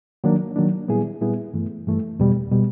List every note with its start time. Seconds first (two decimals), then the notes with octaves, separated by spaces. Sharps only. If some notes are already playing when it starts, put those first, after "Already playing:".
0.24 D#3 F#3 A#3 D4
0.56 D#3 F#3 A#3 D4
0.88 A#2 G3 B3 E4 G#4
1.21 A#2 G3 B3 E4 G#4
1.53 G2 E3 A3
1.87 G2 E3 A3
2.19 E2 B2 G3
2.52 B2 G3